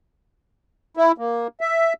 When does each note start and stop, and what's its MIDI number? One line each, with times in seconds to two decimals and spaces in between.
0.97 1.12 64
1.18 1.48 58
1.61 1.93 76